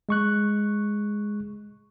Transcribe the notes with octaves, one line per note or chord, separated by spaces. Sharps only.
G#3 C#6 F#6